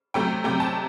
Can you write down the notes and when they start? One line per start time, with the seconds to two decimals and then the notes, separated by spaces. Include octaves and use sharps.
0.14 C3 F#3 A3 G5
0.44 C3 F#3 A3 G5
0.60 A5